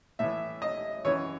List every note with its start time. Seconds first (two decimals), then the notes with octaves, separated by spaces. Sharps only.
0.19 A2 E3 E5
0.62 D#5
1.05 F#2 E3 C#5